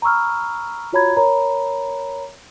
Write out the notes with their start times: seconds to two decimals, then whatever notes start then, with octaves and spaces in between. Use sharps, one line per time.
0.02 A#5 B5 C#6 E6 F6
0.93 F4 F#4 C#5 A#5 B5 G#6
1.17 A#4 C#5 A#5 B5